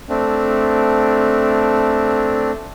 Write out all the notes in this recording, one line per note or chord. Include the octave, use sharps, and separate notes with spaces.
A3 C4 D4